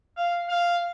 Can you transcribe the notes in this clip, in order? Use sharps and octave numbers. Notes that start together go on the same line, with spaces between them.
F5
F5